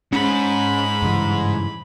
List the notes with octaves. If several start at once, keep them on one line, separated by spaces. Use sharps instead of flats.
G#2 C#4 B5
G2 C#3 E3